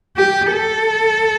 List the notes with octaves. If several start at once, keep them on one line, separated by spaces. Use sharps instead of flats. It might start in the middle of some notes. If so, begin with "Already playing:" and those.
G4
A4